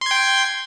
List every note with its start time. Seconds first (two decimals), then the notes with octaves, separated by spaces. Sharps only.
0.01 C6
0.06 G#6
0.11 G5